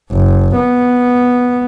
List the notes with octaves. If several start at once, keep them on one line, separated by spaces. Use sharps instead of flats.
F#1
B3